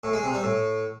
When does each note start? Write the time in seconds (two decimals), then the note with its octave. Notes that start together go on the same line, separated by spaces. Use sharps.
0.04 A2
0.13 G#3
0.23 C3
0.33 G3
0.43 A2